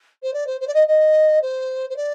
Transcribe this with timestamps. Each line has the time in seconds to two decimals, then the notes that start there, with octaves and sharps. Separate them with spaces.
0.22 C5
0.33 D5
0.46 C5
0.60 C5
0.67 D5
0.74 D#5
0.87 D#5
1.41 C5
1.89 C5
1.96 D5